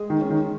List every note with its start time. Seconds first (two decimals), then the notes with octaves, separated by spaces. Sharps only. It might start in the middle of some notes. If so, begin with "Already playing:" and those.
Already playing: G#3
0.10 D#3
0.21 C#4
0.30 D#3